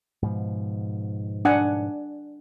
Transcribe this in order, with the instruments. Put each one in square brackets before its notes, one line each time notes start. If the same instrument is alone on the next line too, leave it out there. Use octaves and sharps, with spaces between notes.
[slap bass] G#2 B2 F3
[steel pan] D4 F#5 G#5